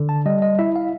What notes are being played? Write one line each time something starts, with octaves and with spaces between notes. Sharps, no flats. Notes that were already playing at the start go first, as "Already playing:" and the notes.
Already playing: D3
A5
G3 D#5
D#5
E4 E5
F5